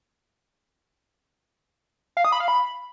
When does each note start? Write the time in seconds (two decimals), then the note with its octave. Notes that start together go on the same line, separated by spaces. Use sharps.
2.17 F5
2.25 D#6
2.32 B5
2.40 F5
2.48 B5